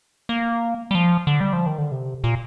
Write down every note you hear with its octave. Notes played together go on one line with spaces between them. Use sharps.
A#3
G3
F3
D3
G3
F3
D#3
D3
C3
A#2